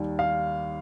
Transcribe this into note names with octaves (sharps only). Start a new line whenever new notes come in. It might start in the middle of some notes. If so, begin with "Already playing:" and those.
Already playing: D#2 D#3 G3
F5